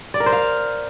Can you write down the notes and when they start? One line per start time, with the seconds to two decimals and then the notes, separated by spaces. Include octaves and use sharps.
0.14 D5
0.20 A#4
0.26 C5
0.32 F5